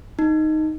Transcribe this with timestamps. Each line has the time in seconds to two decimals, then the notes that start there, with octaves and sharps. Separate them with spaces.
0.19 D#4